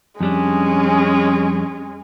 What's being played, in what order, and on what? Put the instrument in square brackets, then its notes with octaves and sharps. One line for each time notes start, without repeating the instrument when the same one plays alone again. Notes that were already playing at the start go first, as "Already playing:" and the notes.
[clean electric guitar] F2 G3 D4 [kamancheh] G#3 C#4